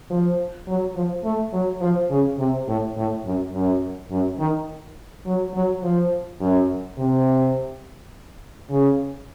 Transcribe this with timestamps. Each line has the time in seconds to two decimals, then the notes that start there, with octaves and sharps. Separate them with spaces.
0.10 F3
0.68 F#3
0.95 F3
1.24 A3
1.53 F#3
1.81 F3
2.10 C#3
2.38 C3
2.67 A2
2.97 A2
3.25 F#2
3.54 F#2
4.11 F#2
4.39 D#3
5.26 F#3
5.54 F#3
5.83 F3
6.41 F#2
6.98 C3
8.70 C#3